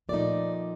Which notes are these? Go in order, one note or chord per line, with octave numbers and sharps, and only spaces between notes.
A#2 F3 A3 D#4 D5